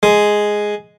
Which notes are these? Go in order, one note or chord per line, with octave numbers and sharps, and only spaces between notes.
G#3